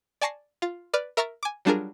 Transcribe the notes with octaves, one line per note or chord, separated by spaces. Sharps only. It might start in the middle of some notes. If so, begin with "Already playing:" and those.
D5 G#5 A5 C#6 A#6 C7
F4 A6
B4 D5 F6
A#4 E5 A#5 C#6 F6 A6
G#5 D6
F#3 G3 D4 F4 G#4 A#4